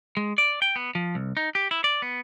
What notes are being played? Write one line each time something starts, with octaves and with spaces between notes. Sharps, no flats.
G#3
D5
G5
B3
F3
C2
D#4
G4
E4
D5
B3